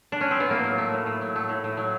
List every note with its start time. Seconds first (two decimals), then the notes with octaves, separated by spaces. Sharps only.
0.12 D4
0.21 C#4
0.31 C4
0.40 B3
0.49 A2 A#3
0.64 F#3
0.78 A3
0.93 A2
1.06 A2
1.21 F#3
1.36 A3
1.49 A2
1.64 A2
1.77 F#3